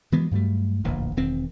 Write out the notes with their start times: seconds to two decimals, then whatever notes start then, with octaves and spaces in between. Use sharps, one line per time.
0.12 E3 F#3 G#3 B3
0.31 G2 F#3 G3 A3
0.84 D1 A#1 E2
1.17 E1 D#3 C4